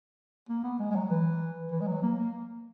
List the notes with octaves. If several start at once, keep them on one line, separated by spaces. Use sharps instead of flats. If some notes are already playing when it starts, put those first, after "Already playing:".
A#3
B3
G#3
G#3
F#3
E3
E3
G#3
F#3
A#3
A#3